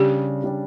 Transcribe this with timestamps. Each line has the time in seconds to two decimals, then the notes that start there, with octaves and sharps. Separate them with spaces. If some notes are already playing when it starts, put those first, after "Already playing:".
Already playing: C#3 G3 D4 G4
0.44 C#3 G3 D4